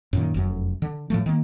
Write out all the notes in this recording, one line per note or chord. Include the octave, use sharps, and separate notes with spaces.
F#2 A#2 D#3
F1 F#2
D3
A2 F3 A3
D#3 A#3